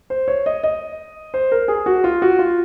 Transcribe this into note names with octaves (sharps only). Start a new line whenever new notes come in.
C5
C#5
D#5
D#5
C5
A#4
G#4
F#4
F4
F#4
F4